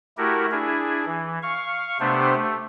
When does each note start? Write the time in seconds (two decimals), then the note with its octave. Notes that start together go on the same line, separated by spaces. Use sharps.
0.18 A3 E4 F#4 G4 A#4
0.51 D4 E4 G#4
1.05 E3
1.42 F5 C#6
2.00 C3 A3 B3 D4 G4 C5
2.35 A3